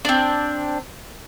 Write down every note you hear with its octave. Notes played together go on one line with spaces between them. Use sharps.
C4 D4